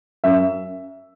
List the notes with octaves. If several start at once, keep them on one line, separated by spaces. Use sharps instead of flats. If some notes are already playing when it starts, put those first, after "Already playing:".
F#2 E5